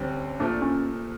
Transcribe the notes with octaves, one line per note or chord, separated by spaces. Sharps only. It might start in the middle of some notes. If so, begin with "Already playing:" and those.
Already playing: D2 D3 G3 C4 C#4
A#2 F3 A3 D4
C#4